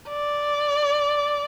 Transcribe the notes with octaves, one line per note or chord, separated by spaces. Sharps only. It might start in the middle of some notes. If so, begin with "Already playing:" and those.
D5